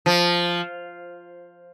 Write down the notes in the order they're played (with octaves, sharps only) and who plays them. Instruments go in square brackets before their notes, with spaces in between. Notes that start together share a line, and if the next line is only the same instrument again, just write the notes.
[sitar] F3